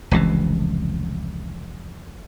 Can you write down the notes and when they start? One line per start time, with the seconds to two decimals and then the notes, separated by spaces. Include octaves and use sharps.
0.11 F1 C#2 C3 E3